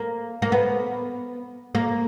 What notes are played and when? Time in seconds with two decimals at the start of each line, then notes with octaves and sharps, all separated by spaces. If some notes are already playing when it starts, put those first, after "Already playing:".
Already playing: A#3
0.42 A#3
0.52 B3
1.75 A#3